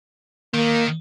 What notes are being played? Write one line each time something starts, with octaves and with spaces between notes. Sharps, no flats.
D#3 A#3